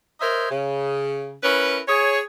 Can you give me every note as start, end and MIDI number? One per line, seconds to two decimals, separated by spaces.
0.21 0.50 70
0.21 0.50 72
0.21 0.50 73
0.21 0.50 75
0.21 0.50 76
0.50 1.35 49
1.43 1.80 61
1.43 1.80 64
1.43 1.80 70
1.43 1.80 71
1.88 2.21 68
1.88 2.21 73